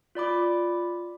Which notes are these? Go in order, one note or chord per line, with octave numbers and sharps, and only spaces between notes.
F4 D5 B5 D6